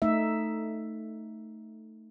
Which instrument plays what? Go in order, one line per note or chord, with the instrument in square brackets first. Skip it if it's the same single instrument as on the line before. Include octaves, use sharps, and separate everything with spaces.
[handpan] A3 D#4 E5